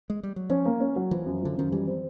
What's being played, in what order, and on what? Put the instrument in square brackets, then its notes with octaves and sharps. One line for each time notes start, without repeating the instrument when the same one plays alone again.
[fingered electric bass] G#3
G3
F#3
[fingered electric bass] F3 [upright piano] C#4
[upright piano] A#3
C#4
F#3
[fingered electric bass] E3 [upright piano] F3
[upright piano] F#2
[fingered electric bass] D3 [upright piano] F3
[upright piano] F#2 [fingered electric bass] D#3
[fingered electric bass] E3 [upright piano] G3
[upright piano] C4